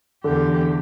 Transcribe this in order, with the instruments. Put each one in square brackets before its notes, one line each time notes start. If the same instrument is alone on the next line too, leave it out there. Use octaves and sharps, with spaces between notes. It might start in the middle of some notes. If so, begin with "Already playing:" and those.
[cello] E2 G4 [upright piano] D3